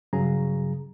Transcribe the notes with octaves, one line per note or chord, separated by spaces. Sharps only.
G2 C#3 F#3 G#4 A#5